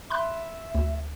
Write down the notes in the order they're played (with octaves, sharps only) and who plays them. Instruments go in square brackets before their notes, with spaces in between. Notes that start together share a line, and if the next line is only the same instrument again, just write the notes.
[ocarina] E5 [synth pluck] B5 C6 F#6
[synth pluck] D2